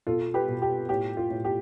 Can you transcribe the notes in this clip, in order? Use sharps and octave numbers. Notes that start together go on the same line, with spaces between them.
B2 F4 A4
G4 B4
B2
G4
A2 G4
F4
A2
G4